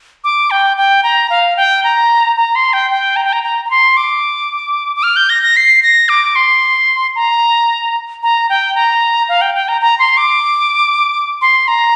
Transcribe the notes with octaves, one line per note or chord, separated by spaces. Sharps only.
D6
G5
G5
A#5
F5
G5
A#5
A#5
C6
G5
G5
A#5
G5
A#5
A#5
A#5
C6
D6
D6
F6
G6
A#6
A#6
C7
A#6
D6
C6
A#5
A#5
G5
A#5
F5
G5
G5
A#5
A#5
C6
D6
C6
A#5